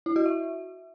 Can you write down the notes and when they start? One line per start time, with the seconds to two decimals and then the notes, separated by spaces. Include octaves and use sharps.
0.06 E4
0.16 F#4
0.26 E5